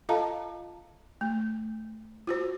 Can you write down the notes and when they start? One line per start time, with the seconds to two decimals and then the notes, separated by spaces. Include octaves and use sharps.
0.09 F4 A4 D#5 F5 A5 A#5
1.21 A3
2.27 F4 F#4 C5